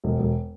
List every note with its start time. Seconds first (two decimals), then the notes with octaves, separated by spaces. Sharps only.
0.04 E1
0.19 E1